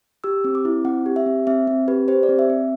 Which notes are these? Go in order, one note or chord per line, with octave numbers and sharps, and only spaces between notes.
G4 E6
C4
D6
E4
C4 F#5
G4
E5
C4
C4 E5
C4
G4 B4
G4 C5
D5
C4
E5
C4